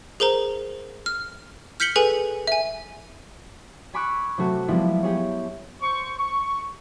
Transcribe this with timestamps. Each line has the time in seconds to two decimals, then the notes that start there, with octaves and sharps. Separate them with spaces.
0.20 G#4 A#4 C5 A#5
1.06 F6
1.80 F6 G6 B6 C#7 F#7 G7
1.96 G#4 A4 B4 G#5
2.47 E5 G#5
3.94 G#5 B5 C#6 D6 E6 F#6
4.38 C3 F#3 A3 F#4
4.68 F3 G3 G#3 B3 E4
5.03 G4 G#4 C#5
5.81 C5 C#6
6.18 C#6